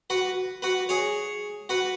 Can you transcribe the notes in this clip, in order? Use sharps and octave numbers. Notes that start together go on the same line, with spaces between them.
F#4 B4
F#4 B4
G#4 C#5
F#4 B4